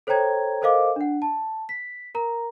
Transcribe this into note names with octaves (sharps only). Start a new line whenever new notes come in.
A4 C5 C#5 G5 A#5 G#6
A4 A#4 C5 D#5 F5 D6
D4 F#5
A5
B6
A#4 A#5